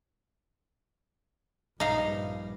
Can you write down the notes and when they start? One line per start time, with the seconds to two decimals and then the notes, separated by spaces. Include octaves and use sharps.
1.80 A#1 G2 D#4 F5